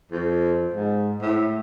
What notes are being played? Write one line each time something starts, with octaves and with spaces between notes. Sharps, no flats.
F2
G#2
A2